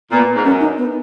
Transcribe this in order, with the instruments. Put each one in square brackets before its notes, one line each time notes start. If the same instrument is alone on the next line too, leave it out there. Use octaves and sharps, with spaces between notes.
[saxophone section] A#2 [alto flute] B3
[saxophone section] G#2
[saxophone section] F#2 [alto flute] C#4
[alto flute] D#4
B3